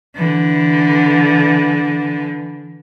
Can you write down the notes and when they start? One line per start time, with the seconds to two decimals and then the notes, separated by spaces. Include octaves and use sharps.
0.17 D3 E3